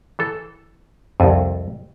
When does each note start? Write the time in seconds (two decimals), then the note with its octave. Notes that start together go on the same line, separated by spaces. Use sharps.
0.19 E3 A4
1.20 C2 F2